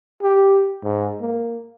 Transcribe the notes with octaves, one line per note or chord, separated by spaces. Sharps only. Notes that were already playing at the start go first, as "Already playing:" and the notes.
G4
G#2
A#3